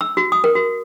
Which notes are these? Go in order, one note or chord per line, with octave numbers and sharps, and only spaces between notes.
E6
F#4
D#6
A#4
F#4